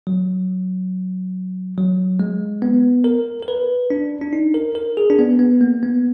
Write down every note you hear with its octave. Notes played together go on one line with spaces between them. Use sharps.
F#3
F#3
G#3
B3
A#4
A#4
B4
D4
D4
D#4
A#4
A#4
G#4
D4
B3
B3
A#3
B3